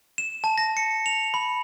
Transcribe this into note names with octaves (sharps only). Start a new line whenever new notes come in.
E7
A5
A#6
C#7
F7
B5